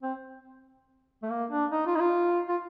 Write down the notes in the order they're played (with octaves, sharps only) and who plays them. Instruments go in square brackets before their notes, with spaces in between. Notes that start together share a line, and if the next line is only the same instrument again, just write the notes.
[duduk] C4
A3
A#3
D4
D#4
F4
D#4
F4
F4